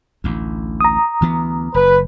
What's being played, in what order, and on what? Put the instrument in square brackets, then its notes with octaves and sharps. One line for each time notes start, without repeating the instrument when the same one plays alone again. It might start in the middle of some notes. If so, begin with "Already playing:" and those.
[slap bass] A1 D2
[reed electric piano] A#5 D#6
[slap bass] D2 E3 B3
[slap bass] F#1 [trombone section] B4